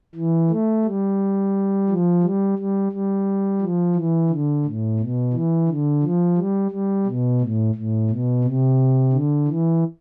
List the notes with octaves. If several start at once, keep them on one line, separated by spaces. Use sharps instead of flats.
E3
A3
G3
F3
G3
G3
G3
F3
E3
D3
A2
B2
E3
D3
F3
G3
G3
B2
A2
A2
B2
C3
D3
E3